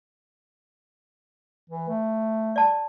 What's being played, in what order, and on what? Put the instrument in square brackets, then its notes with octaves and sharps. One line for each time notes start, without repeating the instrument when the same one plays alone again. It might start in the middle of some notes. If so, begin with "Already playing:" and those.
[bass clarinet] E3
A3
[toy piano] D5 A5